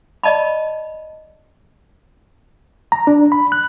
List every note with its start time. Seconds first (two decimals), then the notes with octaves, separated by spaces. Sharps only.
0.23 D5 D#5 A5 B5
2.92 A#5
3.07 D4
3.32 B5
3.52 F#6